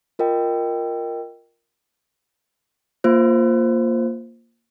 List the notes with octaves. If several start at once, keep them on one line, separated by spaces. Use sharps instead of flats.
F4 A#4 D#5 G5
A#3 F4 C5